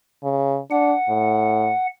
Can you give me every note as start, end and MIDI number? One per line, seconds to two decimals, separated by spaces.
0.23 0.59 49
0.71 0.94 62
0.71 1.87 78
1.09 1.71 45